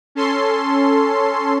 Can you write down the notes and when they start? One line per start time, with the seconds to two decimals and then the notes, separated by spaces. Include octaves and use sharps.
0.15 C#4 A4 C6